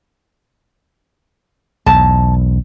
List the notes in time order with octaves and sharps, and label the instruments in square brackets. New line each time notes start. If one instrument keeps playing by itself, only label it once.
[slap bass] B1 E2 [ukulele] A5